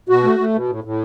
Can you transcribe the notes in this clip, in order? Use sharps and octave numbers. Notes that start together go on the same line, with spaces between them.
B2 F#4
A3
A3
B2
A2
A2